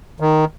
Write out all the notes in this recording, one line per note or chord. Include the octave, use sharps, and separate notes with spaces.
D#3